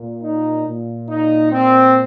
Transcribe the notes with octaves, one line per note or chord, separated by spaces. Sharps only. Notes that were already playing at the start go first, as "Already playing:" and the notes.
Already playing: A#2
D#4
A#2
D#4
C4